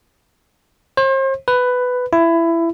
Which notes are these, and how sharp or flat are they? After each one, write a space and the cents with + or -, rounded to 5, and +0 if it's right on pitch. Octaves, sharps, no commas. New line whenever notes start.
C5 +40
B4 +10
E4 +20